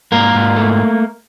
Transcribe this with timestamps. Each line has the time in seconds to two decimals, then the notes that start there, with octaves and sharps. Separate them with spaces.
0.12 G#2 A#3 A#4
0.35 G#2
0.56 A3